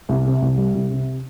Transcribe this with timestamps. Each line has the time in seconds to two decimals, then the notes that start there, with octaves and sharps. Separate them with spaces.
0.09 C2
0.25 C3
0.42 C2
0.58 G3
0.74 C2
0.91 C3